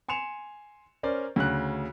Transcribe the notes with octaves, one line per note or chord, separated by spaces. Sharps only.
G#5 C6 C#7 E7 F7
C#4 A#4 C5 D5
D2 C#3 F#6